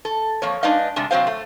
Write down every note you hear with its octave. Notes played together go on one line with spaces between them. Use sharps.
A4
F2 A#3 C#5
G#3 D4 D#4 B4 D#5 F5
C3 G3 G#3 D4
C3 F#3 C4 C5 F5
A3